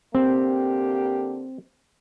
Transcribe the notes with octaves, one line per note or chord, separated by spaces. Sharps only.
D3 A#3 C4 G4